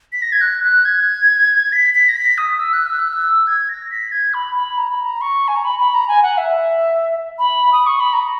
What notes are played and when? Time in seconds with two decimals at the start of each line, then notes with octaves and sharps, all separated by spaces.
0.13 B6
0.22 A#6
0.32 G#6
0.41 F#6
0.64 F#6
0.85 G#6
1.72 B6
1.95 B6
2.09 A#6
2.16 B6
2.38 D#6
2.59 E6
2.73 F#6
2.87 E6
2.99 F#6
3.13 E6
3.47 G#6
3.69 A#6
3.91 B6
4.12 G#6
4.34 B5
4.55 B5
4.78 A#5
4.91 B5
5.04 A#5
5.21 C#6
5.48 G#5
5.56 A#5
5.65 B5
5.79 B5
5.94 A#5
6.08 G#5
6.23 F#5
6.38 E5
7.39 B5
7.73 D#6
7.86 C#6
8.00 B5
8.13 A#5